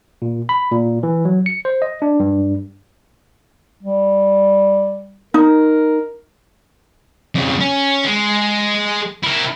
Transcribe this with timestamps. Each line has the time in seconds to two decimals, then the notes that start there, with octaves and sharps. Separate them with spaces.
0.22 A#2
0.49 B5
0.71 A#2
1.03 E3
1.25 F#3
1.46 C#7
1.65 C5
1.82 D#5
2.02 D4
2.20 G2
3.83 G3
5.34 D#4 A#4
7.35 F2 C#3
7.61 C#4
8.05 G#3
9.23 E4 A#4